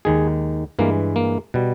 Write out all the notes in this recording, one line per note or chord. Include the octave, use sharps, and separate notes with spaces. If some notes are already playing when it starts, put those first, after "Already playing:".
D#2 D#3 G#3 G#4
G2 E3 G#3 A#3
A#3
B2 G3